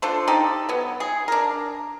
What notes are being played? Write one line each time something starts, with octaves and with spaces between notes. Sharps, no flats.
D4 F4 A4 C5
D#4 G4 A4
F#3 B3
G#4
D4 A#4